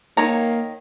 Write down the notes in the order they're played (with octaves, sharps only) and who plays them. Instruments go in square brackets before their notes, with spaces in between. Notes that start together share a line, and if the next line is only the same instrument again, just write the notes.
[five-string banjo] D#3 C#5 A#5 [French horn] A#3